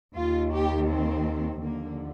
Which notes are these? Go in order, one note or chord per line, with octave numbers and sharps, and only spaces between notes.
D#2 D#3 F4
G4
C4
D#2 D3 F3 A#3